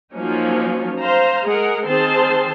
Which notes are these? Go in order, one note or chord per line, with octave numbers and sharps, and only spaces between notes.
F3 F#3 A#3 C#4 D#4
C5 F5 A#5
G#3 G#4 A#4 F#5
D#3 C4 G#4 C5 A5 C6